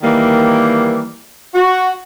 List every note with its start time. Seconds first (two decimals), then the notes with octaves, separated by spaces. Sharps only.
0.03 D#3 E3 G3 A#3
1.55 F#4